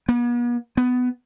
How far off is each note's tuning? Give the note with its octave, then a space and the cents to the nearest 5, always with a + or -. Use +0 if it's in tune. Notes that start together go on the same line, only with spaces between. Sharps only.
B3 -45
B3 +15